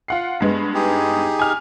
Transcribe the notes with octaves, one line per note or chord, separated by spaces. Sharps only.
F4 F#5 C7
G2 G#3 B3
D#4 G4 G#4
G#5 F6